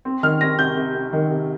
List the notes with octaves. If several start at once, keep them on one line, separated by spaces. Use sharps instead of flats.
C4
D#3 F6
C4 A#6
C3 G6
C3
C3
D#3
C3